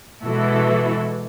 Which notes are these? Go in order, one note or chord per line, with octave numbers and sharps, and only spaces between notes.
B2 E3 G#3 E4 F#4 A4